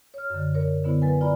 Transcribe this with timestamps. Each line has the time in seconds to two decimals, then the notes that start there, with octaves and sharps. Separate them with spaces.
0.14 C#5 F6
0.30 F#2 D3
0.55 A#4 C#5
0.84 D3 B3 E4 C5
1.02 F#3 B4 G#5
1.21 F4 D5 G#5 A#5 B5